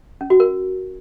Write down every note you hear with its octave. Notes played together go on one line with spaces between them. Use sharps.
C#4
F#4
A#4